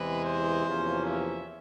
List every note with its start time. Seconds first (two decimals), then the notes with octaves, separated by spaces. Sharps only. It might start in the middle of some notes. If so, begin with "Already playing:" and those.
Already playing: E2 C3 E3 G#3 B4
0.25 C5
0.65 E2 C3 F3 A#3 C#4
1.06 E5